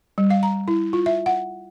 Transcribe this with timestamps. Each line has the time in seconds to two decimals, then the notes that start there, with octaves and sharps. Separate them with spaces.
0.18 G3
0.30 F5
0.43 A#5
0.68 E4
0.93 F4
1.06 E5
1.26 F#5